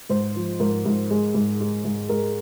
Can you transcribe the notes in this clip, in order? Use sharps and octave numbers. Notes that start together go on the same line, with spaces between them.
G#2 C5
F3
G#2 A#4
G#2
G#3
G#2
G#3
G#2
G#3 A#4